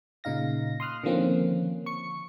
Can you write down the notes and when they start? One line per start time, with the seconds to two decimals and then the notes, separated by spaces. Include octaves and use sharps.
0.24 A#2 C#3 D#4 F5 A#6
0.80 C6 D#6 F6 F#6
1.04 D3 D#3 F3 A#3 C4 C#4
1.86 C#6 C#7